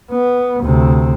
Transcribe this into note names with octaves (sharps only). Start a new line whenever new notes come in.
B3
D2 C3